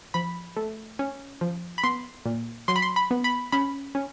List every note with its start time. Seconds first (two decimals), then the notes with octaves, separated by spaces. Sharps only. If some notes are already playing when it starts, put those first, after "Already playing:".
0.14 F3 B5
0.56 A3
0.99 C#4
1.41 F3
1.78 B5
1.84 B3 C6
2.26 A#2
2.68 F#3 C6
2.76 B5
2.82 C6
2.96 B5
3.11 B3
3.24 B5
3.52 C#4 B5
3.95 C#4